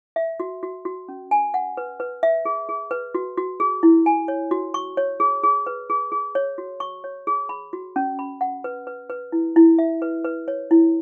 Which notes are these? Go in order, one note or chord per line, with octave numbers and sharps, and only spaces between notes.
E5
F#4
F#4
F#4
C#4
G#5
F#5
B4
B4
E5
G#4
G#4
B4
F#4
F#4
G#4
E4
G#5
C#5
F#4
C#6
C#5
G#4
G#4
B4
G#4
G#4
C#5
F#4
C#6
C#5
G#4
B5
F#4
C#4
B5
F#5
B4
B4
B4
E4
E4
E5
B4
B4
C#5
E4